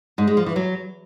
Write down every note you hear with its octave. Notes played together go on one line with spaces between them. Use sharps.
G#2
G#3
F3
E3
F#3